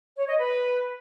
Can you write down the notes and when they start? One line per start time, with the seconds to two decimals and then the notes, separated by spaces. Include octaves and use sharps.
0.16 C#5
0.27 D#5
0.38 B4